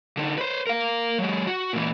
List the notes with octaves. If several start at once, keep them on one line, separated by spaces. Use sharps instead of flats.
D3 D#4
B4 C5
A#4 F5
F#3 G#3
F#4
A#2 E3